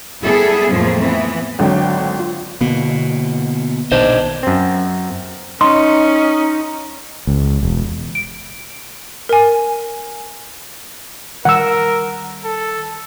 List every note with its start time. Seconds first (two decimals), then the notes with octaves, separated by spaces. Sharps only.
0.21 G3 B3 E4 G#4 A4
0.71 F2 A2 F3 A3 A#3 C4
1.00 E3 B3
1.59 G#1 D3 F#3 G5
2.19 F4
2.61 B2 D3 A#3 B3
3.92 A#1 B2 D#3 D4 C5 D#5
4.43 F#2 C4
5.61 C#4 D#4 C6
7.27 C#2
7.63 E1
8.15 D7
9.29 A#4 G#5
11.45 D#3 G3 A#4 F#5 E6
12.44 A4